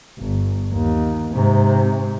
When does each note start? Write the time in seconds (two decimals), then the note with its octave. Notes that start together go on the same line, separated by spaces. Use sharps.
0.19 G1
0.73 D#2
1.33 G#2 C3